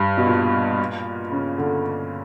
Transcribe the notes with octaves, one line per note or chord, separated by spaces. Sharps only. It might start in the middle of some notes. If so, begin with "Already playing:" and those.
Already playing: G2
B2
A#2
C#3
D3